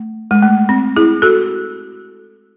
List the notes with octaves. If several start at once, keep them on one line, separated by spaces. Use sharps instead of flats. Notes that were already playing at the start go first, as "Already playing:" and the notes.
Already playing: A3
G#3
A3
C4
E4 G#4
F#4 A4